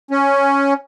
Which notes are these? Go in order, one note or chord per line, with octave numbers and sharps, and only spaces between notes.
C#4